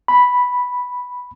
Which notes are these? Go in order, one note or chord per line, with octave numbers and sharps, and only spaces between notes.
B5